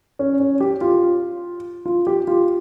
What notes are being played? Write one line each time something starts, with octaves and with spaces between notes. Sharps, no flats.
C#4
C#4
G4
F4
F4
G4
F4